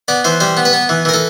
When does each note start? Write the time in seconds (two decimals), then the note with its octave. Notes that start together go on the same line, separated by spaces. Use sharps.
0.08 B3 D5
0.24 E3 C5
0.40 G3 C5
0.57 B3
0.65 B4
0.73 B3
0.89 E3
1.05 E3 A#4
1.14 A4